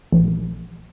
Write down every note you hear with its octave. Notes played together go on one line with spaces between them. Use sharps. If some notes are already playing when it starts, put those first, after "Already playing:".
A#1